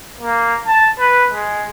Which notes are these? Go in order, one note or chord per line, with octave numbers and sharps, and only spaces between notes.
A#3
A5
B4
G#3